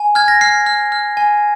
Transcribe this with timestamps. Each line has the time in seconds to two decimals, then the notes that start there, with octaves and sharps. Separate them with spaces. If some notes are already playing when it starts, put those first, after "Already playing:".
Already playing: G#5
0.15 F6 G#6
0.28 A#6
0.41 F6 C7
0.66 F6
0.92 F6
1.17 G#5